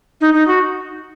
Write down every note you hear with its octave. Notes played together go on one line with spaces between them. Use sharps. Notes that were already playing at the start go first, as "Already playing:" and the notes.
D#4
D#4
F#4